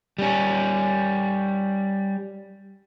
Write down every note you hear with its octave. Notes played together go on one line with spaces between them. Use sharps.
G3 C#4